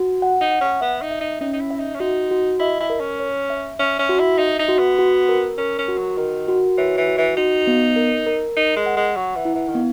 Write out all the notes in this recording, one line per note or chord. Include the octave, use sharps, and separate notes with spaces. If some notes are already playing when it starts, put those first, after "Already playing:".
Already playing: F#4
F#5
D#4
F#5
C#4
B3 E5
D#4
E5
D#4
C#4 D#4
D#4
E4
E5
D#4
C#4
D#4 F#4
F#4
E4 D#5
E4
A#4
C#4
C#5
E5
C#4 E5
C#4
F#4
E4
D#4 E5
D#4
F#4
B3
F#4
A#4
C#4 A#4
C#4
F#4
F#3
D#3 A#4
F#4
E3 C#5
E3
F#4
E3
D#4 F#4
B3
A#4
A#4
D#4 A#4
G#3
F#5
G#3
F#3 F#5
E3
E4
E3
D#3
B3